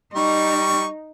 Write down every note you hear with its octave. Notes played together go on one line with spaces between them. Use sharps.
G3 D#4 C#6